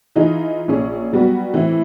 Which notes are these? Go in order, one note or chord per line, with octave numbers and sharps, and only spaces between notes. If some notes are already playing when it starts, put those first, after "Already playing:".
E3 D#4 F4 G#4
A#1 C#4 G#4
F#3 G3 B3 F#4
A2 E3 C4 E4